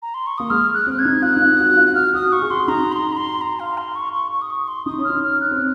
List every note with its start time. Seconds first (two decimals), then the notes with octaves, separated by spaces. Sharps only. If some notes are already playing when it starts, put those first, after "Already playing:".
0.02 A#5
0.14 C6
0.27 C#6
0.38 A#3 D#6
0.50 G#3 F6
0.74 F#6
0.86 C4
0.99 G#6
1.05 D#4
1.22 F4 F#6
1.37 D#4
1.41 F4
1.59 F#4
1.77 F4
1.95 F#4 F6
2.14 F#4 D#6
2.32 F#4 C#6
2.42 G#4
2.49 F#4 C6
2.68 D#4 A#5
2.92 C6
3.12 A#5
3.17 C6
3.41 A#5
3.60 F5
3.78 C6
3.95 C#6
4.13 C#6
4.32 C#6
4.42 D#6
4.50 C#6
4.68 C6
4.86 D#4 D#6
4.98 C#4
5.04 F6
5.10 D#4
5.23 F6
5.41 F#6
5.51 C4